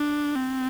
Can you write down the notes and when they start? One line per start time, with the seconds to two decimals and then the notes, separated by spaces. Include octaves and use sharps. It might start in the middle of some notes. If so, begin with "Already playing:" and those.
Already playing: D4
0.35 C4